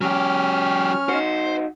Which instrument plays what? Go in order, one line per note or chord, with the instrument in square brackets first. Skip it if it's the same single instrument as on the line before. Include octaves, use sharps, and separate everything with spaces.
[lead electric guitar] F#3 G4 [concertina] C#4 F6
[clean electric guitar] D#4 F#4 [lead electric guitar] C5